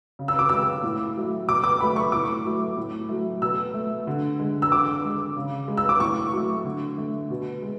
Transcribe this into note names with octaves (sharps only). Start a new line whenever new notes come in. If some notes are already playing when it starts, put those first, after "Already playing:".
C#3
E6
D6
G#3 E6
A2
F#3 A3
B2 D6
D6
F#3 A3 B5
C#6
A2 D6
F#3 A3
A2
F#3 A3
B2 E6
A3
D3
G#3
E6
D3 D6
G#3
C#3
G#3
E6
D6
A2 C#6
F#3
A3
D3
A3
B2
G#3